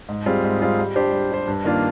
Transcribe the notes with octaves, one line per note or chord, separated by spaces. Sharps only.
G#2
G3 C4 F4 G#4
G#2
G3 C4 F4 G#4
G3
D4 G4 C5
G3
D4 G4 C5
G2
D#3 A#3 D4 F4